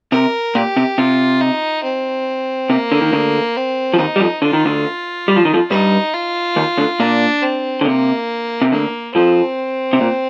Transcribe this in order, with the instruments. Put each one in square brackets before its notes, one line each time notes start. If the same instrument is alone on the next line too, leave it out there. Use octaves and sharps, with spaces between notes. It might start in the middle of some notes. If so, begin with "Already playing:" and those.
[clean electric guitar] C3 [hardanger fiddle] A#4
[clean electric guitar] A#2 [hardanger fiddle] G4
[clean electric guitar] C3
[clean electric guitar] C3 [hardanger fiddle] F4
[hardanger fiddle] D#4
C4
[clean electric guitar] C3 [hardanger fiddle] A#3
[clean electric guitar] D3
D#3
D2 D3
[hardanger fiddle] C4
[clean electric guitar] F3
[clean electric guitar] D#2 D#3 [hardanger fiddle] D#4
[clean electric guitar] G3
F2 F3
[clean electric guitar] D3 [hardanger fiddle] F4
[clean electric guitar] D#3
D2 D3
G3
F3
D#3
F2 F3
[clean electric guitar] G2 G3 [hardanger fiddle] D#4
[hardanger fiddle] F4
[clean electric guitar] D#2 D#3
D2 D3
[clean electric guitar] A#2 [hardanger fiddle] D4
[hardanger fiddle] C4
[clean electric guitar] D3
[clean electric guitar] C3 [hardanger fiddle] A#3
[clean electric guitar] C3
[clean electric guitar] D2 D3 [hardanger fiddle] A#3
[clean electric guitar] F2 F3 [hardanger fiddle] C4
[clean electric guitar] C3
A#2